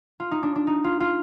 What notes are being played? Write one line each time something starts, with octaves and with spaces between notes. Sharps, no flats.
F4
D#4
D4
D4
D#4
F4
F4